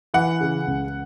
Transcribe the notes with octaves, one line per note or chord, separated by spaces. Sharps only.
E3 F#5
C#3
C#2